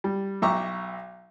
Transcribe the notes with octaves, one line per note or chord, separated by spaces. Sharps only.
G3
B1 E5 G5 A#5 C#6 D6